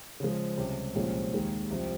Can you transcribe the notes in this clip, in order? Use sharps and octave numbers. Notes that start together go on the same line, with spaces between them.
C#3 F3 G#3
C#2 C3 G3 C#4 G4
C2 A#2 F3 G#3 C#4
D#2 D#3 G#3
C2 C3 F3